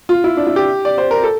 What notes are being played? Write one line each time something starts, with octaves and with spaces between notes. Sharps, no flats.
F4
E4
D4
E4
G4
D5
C5
A#4
A4